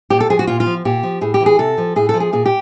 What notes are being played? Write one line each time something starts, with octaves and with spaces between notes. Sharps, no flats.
A#2 G4
A4
F3 G#4
F#4
A#2 F4
F4
F3
A#2 G4
F3
A2 G#4
G4
E3
G#4
C3 A4
F3
A2 G#4
F3 A4
G#4
A#2 G#4
G4